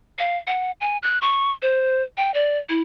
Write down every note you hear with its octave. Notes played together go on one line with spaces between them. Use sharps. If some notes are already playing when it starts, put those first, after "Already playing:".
F5
F#5
G#5
F#6
C#6
C5
G5
D5
E4